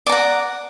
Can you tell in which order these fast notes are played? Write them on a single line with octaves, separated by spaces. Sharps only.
D5 A#5 F#5